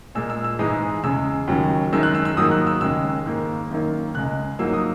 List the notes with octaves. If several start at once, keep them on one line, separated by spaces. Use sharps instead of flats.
A#2 G#3 E6
E6
E6
G#2 E3 G#3 D#6
E2 C#3 G#3 E6
D#2 C#3 F#3
F#2 D#3 G#3 E6
F#6
E6
E6
G#2 D#3 F#3 A#3 D#6
F#6
E6
D#2 C#3 G#3 E6
G#2 D#3 A#3
F#2 D#3 A#3
C#2 C#3 G#3 F#6
G#2 F#3 A#3 E6
D#6